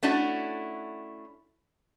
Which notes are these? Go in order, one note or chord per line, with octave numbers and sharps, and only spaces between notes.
A3 C#4 D4 E4 F#4